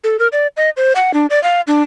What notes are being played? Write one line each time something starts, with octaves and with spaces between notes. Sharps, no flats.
A4
A#4
D5
D#5
C5
F#5
D4
D5
F5
D4